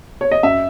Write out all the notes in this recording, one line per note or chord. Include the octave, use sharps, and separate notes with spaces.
C#5
D#5
F#2 E5